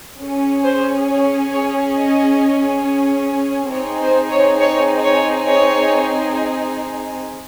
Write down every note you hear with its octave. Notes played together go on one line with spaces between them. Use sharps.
C#4 G#4
C5
C#5
C#5
D#5
C4 D#4 G#4 C#5
C5
C#5
C#5
C#5
C#5